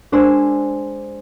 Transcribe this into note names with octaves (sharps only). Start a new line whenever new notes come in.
G#3 D4 C5 G#5 C6 E6